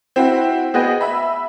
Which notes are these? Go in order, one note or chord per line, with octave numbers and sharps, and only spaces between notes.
C4 E4 F#4
B3 F#4 G#4 B4 D#5 G5
E5 B5